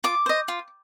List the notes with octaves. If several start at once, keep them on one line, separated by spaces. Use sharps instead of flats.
F4 D6
C5 D#5
F4